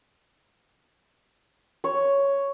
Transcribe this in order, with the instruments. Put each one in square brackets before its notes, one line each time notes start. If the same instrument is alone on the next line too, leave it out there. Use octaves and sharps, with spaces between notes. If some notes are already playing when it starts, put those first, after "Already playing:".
[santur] C#5